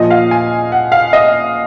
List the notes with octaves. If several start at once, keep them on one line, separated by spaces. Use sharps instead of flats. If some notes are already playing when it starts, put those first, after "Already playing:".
Already playing: A#2 F3 D#5
F5
G#5
F#5
F5
D#5